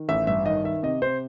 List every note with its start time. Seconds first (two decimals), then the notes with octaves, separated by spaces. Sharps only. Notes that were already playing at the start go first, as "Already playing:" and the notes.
Already playing: D#3
0.09 A1 E5
0.27 G2 E5
0.45 D#3 D#5
0.64 D#3 E5
0.83 C3 D#5
1.02 C3 C5